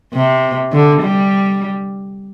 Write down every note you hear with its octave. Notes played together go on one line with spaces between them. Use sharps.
C3
D3
G3